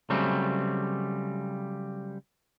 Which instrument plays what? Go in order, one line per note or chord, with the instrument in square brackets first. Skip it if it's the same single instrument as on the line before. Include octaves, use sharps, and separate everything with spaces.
[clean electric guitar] C#3 F#3 G3 A3 C4